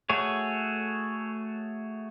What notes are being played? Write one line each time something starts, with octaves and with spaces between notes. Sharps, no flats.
A3 F#4 G#4 C#5